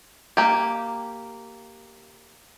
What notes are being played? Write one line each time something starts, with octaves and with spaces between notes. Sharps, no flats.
A#3 G4